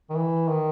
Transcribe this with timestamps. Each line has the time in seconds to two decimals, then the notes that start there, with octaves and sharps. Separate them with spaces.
0.10 D#3
0.16 E3
0.49 D#3